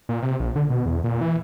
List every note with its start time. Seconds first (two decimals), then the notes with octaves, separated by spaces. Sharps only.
0.09 A#2
0.22 C3
0.40 A#1
0.56 D3
0.70 B2
0.86 E2
1.04 A#2
1.21 E3